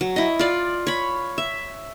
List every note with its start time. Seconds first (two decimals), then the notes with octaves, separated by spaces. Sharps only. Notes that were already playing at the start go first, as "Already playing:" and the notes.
0.01 F#3
0.16 E4 D#5
0.39 F4 D5
0.87 C#5 B5
1.38 E5